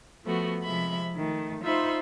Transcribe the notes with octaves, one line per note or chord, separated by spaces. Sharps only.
F3 A3 B3 F#4
C3 F3 G#3 E5 B5
D#3 A3
D#4 F4 C5 E5 B5 C6